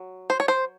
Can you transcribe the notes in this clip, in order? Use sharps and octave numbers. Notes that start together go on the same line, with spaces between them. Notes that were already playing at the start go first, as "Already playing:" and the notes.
Already playing: F#3
C5
C#5
C5